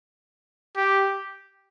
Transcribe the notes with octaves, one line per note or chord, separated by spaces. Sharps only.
G4